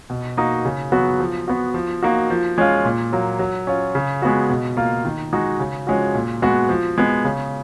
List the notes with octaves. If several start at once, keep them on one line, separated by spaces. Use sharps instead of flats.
B2
A#3 D#4 F#4
C#3
F#3 B3 F#4
F3
B3 F#4
F3
A#3 D#4 F#4
F3
G#3 C#4 F4
A#2
F#3 A#3
F#3
C#4 F4
C#3
G#3 B3 F#4
B2
A#3 F4
D#3
G#3 D#4 F#4
C#3
F3 G#3 C#4 F#4
A#2
G#3 B3 F#4
F3
G#3 B3
C#3